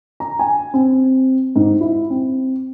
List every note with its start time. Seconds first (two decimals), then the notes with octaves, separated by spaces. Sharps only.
0.20 A#5
0.39 G#5
0.74 C4
1.56 G#2
1.81 E4
2.10 C4